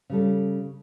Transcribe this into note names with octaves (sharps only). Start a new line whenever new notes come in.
C#3 G3 A4